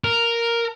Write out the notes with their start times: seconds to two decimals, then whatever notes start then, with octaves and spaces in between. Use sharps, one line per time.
0.04 A#4